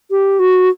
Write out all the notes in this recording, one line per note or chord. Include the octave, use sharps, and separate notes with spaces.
G4
F#4